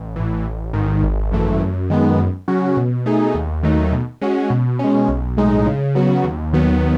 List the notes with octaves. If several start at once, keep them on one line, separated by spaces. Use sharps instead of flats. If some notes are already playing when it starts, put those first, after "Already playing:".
Already playing: A1
A2 E3
A1
G#2 D#3
G#1
F#2 E3 A3
F#2
D#3 G#3 B3
F#2
C#3 F#3 C#4 F#4
B2
A3 D#4 G#4
D#2
D#3 F#3 A3 D#4
B2
G#3 C#4 F#4
B2
G#3 C#4
B1
A2 G#3 D#4
C#3
F#3 B3 F#4
D#2
D#3 F#3 B3